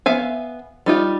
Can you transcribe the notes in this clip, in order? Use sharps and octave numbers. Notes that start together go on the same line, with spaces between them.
B3 E5 F5 G#5
G3 D#4 F4